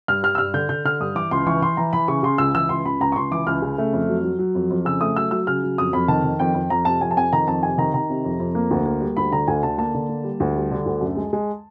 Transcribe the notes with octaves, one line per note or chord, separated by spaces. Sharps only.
G2 F6
G3 F6
E6
G2 F6
D3 G6
D3 G6
D3 F6
G2 D#6
E3 D6
C#2 C6
E3 C#6
E3 C6
E3 A#5
E3 B5
C#3 C#6
C#3 C6
C#2 E6
E3 E6
C#2 C6
C#2 B5
C#2 A#5
C#6
C#2 C6
E3 D6
C#2 F6
C#3
A3
F2
F#3
F#3
F#3
F2
F2
C#3 E6
A3 D#6
F#3 E6
F#3 E6
C#3 F6
F#3
F2 D#6
F2 B5
D#3 A5
D#3
F2 G5
F2
F2 A#5
C3 A5
F2 G#5
A5
F2 G#5
D#3 A#5
F2 A5
C3 G#5
D#3 A#5
D#3 A#5
C3
F2
F2
A#3
D2
A#3
G3
D2 B5
D3 A#5
D2 G#5
D3 A5
A#3 A5
D3
A#3
G3
D2
G3
D3
D2
F#2
G#3
G#3